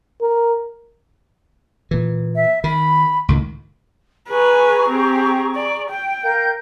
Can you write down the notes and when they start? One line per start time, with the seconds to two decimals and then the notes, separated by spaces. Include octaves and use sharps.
0.22 A#4
1.91 A#2 E3
2.36 E5
2.64 D#3 B5
3.28 C#2 A2 D#3
4.30 G#4 B4 G#5 A#5 C#6
4.89 C4 G4
5.55 D5
5.90 G5
6.23 A#4 F5 G6